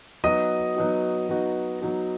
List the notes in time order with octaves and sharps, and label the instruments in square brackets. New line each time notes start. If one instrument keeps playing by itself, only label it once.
[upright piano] F#3 B3 D#4 F#4 [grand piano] D#5 D#6
[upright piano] F#3 B3 D#4 F#4
F#3 B3 D#4 F#4
F#3 B3 D#4 F#4